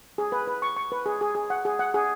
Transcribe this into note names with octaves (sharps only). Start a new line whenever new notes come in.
G#4
B4
B4
C#6
C#6
B4
G#4
G#4
G#4
F#5
G#4
F#5
G#4